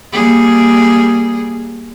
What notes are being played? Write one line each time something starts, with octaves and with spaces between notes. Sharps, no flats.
G3 A#3 G#4